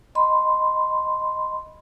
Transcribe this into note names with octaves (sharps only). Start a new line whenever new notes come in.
D#5 B5 C6